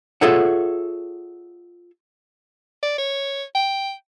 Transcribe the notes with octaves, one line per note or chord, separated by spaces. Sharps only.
F4 G#4 A4 C#5 E5 F#5
D5
C#5
G5